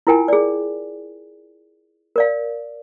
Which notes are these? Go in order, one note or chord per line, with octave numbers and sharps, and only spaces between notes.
E4 F4 A#4 G5 G#5
G#4 D5
A#4 D5 F5